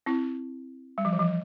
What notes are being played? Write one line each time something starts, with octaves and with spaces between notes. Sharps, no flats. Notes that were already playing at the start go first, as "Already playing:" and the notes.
C4 E4
G3
F3
E3
F3